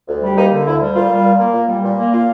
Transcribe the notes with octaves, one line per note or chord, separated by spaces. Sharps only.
D2
G3
A#3 D#4
D3
D2 E4
G3
A#2 F4
G3
A#2
A#3
A#2
G3
A#2
A#3
A#2 F4